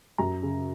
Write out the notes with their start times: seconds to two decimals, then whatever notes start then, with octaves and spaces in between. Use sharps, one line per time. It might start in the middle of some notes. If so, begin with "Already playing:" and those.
0.18 F#2 A#5
0.42 C#3